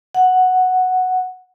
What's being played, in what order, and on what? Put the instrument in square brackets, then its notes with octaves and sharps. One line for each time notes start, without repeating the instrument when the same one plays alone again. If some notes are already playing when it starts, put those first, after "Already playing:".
[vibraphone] F#5